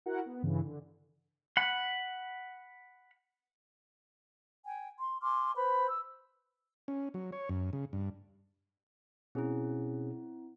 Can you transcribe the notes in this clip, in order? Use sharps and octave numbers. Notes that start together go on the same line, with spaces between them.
E4 F#4 A#4 F#5
B3
G2 C#3 E3
D3
F#5 B5
G5 G#5
C6
G#5 C6 D6 F6
B4 C5 B5
E6
C#4
F#3
C#5
F#2
C#3
G2
B2 C4 C#4 E4 G#4